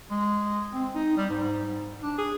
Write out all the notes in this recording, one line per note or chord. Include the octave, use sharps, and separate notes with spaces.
G#3
C4
D#4
G3
G#2
D4
G#4